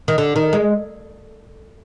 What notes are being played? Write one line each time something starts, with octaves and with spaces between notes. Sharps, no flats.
D#3
D3
D#3
G#3